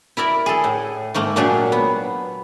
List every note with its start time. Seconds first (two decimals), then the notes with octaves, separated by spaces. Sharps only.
0.17 E4 A#4 D5 E5
0.46 G#4 A4
0.64 A2
1.14 G#2 A3 A#3
1.36 A#2 F#3 D4 G4 G#4 G#5
1.72 B3